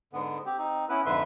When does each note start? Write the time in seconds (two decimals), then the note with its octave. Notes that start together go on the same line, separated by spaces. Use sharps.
0.13 G#2 D3 B3
0.46 C4 G4
0.58 C4 D#4
0.89 B3 C#4 E4 B4
1.06 F2 G#2 D3 B4 E5 C6